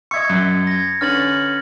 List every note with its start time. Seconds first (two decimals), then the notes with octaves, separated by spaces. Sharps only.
0.11 D#5 E5 C#6 G#6 C#7
0.30 F#2
0.67 G#6 A#6
1.01 D3 C#4 B4 F6 A6 F#7